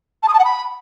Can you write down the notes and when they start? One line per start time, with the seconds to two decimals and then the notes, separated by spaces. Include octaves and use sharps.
0.23 A5
0.28 D#6
0.33 A5
0.39 F#5
0.44 B5